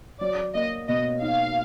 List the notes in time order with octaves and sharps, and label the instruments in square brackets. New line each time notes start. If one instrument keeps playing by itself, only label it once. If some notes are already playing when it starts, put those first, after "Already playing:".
[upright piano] F#3 [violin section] D5
[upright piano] A#3 [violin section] D#5
[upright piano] B2 [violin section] D#5
[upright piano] D#4 [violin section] F5